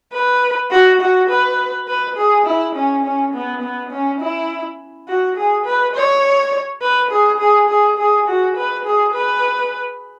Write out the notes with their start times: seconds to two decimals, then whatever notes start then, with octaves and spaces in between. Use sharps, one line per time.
0.13 B4
0.71 F#4
1.01 F#4
1.30 B4
1.88 B4
2.17 G#4
2.46 E4
2.75 C#4
3.04 C#4
3.34 B3
3.62 B3
3.91 C#4
4.21 E4
5.08 F#4
5.37 G#4
5.66 B4
5.95 C#5
6.82 B4
7.11 G#4
7.40 G#4
7.69 G#4
7.98 G#4
8.28 F#4
8.57 B4
8.85 G#4
9.14 B4